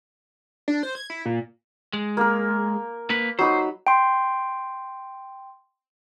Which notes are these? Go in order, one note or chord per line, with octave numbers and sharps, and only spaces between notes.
D4
C5
G#6
E4
A#2
G#3
A#3 A#4
A#3 B4
F#3 D#4 C5 B5
G5 C6